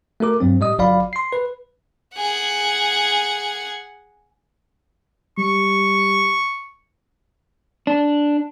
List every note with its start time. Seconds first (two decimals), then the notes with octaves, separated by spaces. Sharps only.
0.20 A3 F#4 A#4 D6
0.40 G2 F#3 C4
0.60 A2 G3 D#5 D#6
0.78 G1 F#3 D5 F5 B5
1.13 C6 C7
1.33 B4
2.16 G#4 F#5
5.38 G3 C#6
7.87 D4